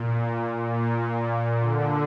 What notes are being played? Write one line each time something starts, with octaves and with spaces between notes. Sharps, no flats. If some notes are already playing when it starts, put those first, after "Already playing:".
Already playing: A#2
A#2
D3